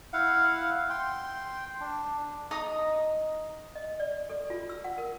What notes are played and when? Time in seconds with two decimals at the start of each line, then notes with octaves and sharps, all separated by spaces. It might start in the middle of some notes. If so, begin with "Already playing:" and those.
0.13 E4 F5 F#5
0.90 G5 C6
1.80 D4
2.51 D#4 D#5 A#5 D#6
3.75 D#5
4.00 D5
4.30 A4
4.50 F4
4.69 E6
4.84 F#5
4.98 A#4